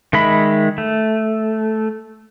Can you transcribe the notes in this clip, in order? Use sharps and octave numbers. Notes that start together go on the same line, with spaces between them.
D#3 G#3 E5 B5
A3